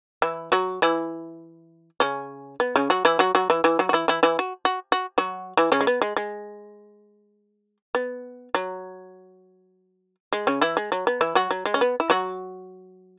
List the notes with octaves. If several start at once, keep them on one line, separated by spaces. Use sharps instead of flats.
E3 E4
F#3 F#4
E3 E4
C#3 C#4
B3
C#3 C#4
F#3 F#4
E3 E4
F#3 F#4
F#3 F#4
E3 E4
E3 E4
F#3 F#4
F#4
E3 E4
E3 E4
E3 E4
F#4
F#4
F#4
F#3 F#4
E3 E4
C#3 C#4
G#3
B3
G#3
G#3
B3
F#3
G#3
C#3 C#4
E3 E4
G#3
F#3
B3
E3 E4
F#3 F#4
F#3
G#3
C#4
B3
E4
F#3 F#4